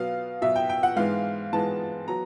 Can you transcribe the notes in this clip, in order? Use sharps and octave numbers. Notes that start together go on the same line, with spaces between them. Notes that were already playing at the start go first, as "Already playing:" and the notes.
Already playing: B2 F#3 B3 F5
B2 F#3 B3 E5
G5
G5
F#5
G#2 E3 G#3 B3 F5
G#2 E3 G#3 B3 A5
F#3 B3 A#5